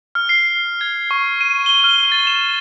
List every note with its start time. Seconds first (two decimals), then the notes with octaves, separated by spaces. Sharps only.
0.15 F6
0.29 C7
0.81 G#6
1.11 C#6
1.41 D#7
1.66 G7
1.84 F6
2.12 A6
2.27 E7